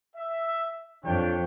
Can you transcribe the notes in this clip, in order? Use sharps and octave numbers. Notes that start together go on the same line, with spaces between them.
E5
F2 D4 C#5 G5